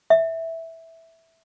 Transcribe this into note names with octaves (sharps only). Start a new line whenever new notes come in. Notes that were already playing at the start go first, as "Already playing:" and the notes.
E5